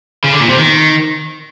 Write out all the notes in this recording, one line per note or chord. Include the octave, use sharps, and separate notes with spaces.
C#3
D3
A#2
C3
D#3